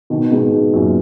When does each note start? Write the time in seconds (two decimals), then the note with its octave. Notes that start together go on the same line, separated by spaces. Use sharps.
0.10 B2 D#3
0.31 G#2 B2
0.52 G#2
0.74 F#2 A#2